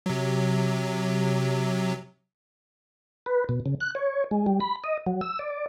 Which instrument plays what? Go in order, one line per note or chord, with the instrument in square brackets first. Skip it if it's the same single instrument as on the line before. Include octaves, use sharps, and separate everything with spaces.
[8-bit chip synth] C3 F#3
[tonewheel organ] B4
B2
C#3
F#6
C#5
G#3
G3
B5
D#5
F#3
E6
D5